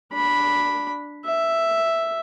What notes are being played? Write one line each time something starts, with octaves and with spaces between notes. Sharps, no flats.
D4 B5
E5